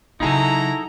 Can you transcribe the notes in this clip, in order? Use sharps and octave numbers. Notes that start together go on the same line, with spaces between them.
C#3 F#3 D#4 E4 F#4 G#4 A4 A#5